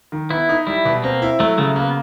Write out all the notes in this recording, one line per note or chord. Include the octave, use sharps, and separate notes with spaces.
D#3
B3 E4
D#4
G3 E4
B2
A#3 C4
E4
F#3 A3
C#3 A3
A#3 B3